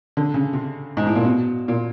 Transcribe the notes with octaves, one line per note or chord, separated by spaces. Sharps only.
D3
C#3
C3
G#2
A2
A#2
B2
A#2